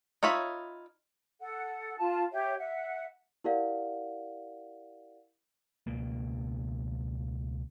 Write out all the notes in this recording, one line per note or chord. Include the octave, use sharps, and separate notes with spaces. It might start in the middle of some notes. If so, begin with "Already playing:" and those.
D#4 F4 C#5 E5 B5
A4 F#5
F4 A5
G4 C#5 E5
E5 F#5
E4 G4 A#4 D5 F5 F#5
C#2 B2 A#3